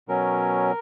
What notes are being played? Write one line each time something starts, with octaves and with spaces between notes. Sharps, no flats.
B2 F#3 C#4 A#4